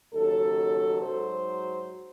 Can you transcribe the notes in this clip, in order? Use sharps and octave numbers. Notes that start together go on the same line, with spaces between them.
D#2 C#3 F#3 A4
G#2 F#3 C5